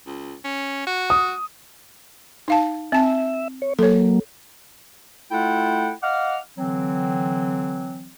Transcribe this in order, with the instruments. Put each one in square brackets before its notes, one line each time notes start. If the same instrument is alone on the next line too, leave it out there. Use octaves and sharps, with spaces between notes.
[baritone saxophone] C#2
C#4
F#4
[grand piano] D#6
[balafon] D#4 F5 A5
[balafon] C4 A5 [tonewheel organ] E5
[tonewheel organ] C#5
[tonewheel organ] F#3 A#3 [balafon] A4 C#5
[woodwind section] A3 E4 F4 A4 F#5 G5
D#5 F5 F#5 D6 F6
D3 E3 F#3 C4